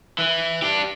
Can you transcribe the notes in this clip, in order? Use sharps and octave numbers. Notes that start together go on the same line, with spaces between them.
E3
D4 G4